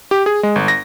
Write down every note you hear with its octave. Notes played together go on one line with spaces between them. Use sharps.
G4
G#4
G#3
G1
A#6